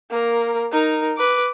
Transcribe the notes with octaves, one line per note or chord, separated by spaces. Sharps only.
A#3 A#4
D#4 A#4
B4 D6